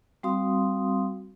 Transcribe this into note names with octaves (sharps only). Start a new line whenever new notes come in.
G3 C4 F#4 F5 C6 D#6